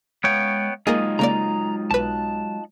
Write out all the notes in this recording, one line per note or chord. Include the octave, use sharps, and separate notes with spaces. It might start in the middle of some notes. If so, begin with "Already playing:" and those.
G#3 B3 C#5 F5 G5
F#3 G#3 A#3 D#4 F4 G#4 D#5
C#3 A#3 D5 A#5
B1 B4 A5 F#6